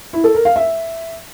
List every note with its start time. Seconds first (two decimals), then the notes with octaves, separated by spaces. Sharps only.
0.13 E4
0.24 A4
0.35 A#4
0.45 F5
0.56 E5